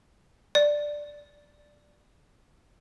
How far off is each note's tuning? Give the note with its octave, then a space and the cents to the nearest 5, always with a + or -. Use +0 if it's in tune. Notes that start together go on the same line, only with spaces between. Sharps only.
D5 +5